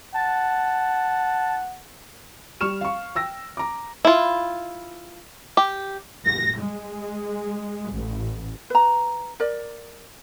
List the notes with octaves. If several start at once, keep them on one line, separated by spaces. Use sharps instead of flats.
F#5 A5
G3 C#6 F6 E7
F5 C#6
G5 E6 A#6
A#5 D6
E4 F4
G4
A#6
G#3
A1
B4 A#5
A#4 D5